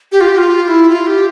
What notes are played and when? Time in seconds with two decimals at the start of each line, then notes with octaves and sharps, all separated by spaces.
0.12 G4
0.21 F4
0.28 G4
0.38 F4
0.63 F4
0.68 E4
0.89 F4
1.07 G4